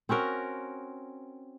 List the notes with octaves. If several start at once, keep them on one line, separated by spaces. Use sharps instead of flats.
C4 C#4 F#4 A#4